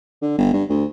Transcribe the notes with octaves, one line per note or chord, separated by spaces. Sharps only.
D3
G1
G2
D2